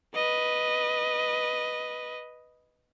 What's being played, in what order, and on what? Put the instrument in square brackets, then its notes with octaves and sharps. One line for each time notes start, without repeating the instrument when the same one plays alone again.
[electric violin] B4 D#5